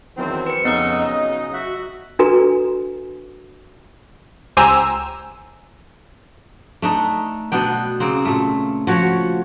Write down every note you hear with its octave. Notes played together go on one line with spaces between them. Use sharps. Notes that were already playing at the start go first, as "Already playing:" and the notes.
E2 D#3 E3 F#3 C4
B4 C#7
F2 C#3 B3 D#4 D#5 F#5 E6
F#3
F#4 E5 F#5
D4 F#4 A4 B4 G#5 A#5
C#2 G4 C5 G#5 A#5 E6
A3 D4 D#4
B2 B3 D4 G5
C#3 A#3 C4
A#2 A3
F3 F#4 C#5